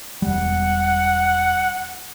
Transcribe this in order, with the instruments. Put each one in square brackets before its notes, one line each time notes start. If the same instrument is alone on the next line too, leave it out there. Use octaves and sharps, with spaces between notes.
[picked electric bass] E1 G3 [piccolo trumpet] F#5